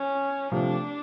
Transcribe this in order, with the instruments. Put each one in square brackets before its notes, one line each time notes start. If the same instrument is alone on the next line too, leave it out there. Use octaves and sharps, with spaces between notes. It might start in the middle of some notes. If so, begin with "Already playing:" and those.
Already playing: [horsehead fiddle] C#4
[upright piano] C3 F3 A3 [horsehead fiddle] D4